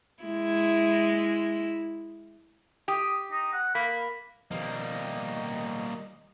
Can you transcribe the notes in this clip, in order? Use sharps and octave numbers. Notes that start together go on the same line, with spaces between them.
G#3 E4
G4 D#6
D#4
F#5
A#3 B5
B2 D#3 F3 G3 A#3 D#5